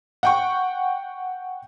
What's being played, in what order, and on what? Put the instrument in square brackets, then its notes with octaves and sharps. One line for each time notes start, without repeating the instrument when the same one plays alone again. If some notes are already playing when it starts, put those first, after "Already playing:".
[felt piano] F#5 G5 C#6